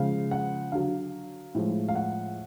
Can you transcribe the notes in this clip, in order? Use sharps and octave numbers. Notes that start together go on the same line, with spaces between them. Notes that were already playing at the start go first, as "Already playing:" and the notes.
Already playing: C#3 F3 G#3 F5
F#5
D3 F#3 F5
A2 F3 G#3
F5
F#5